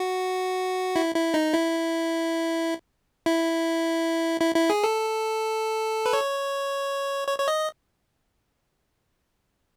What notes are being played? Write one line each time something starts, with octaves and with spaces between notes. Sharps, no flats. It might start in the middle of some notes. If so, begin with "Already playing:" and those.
Already playing: F#4
E4
E4
D#4
E4
E4
E4
E4
G#4
A4
B4
C#5
C#5
C#5
D#5